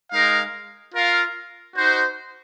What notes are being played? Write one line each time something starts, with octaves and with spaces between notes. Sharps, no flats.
G#3 D#4 A#4 F5
F4 A#4 F5
D#4 F#4 C5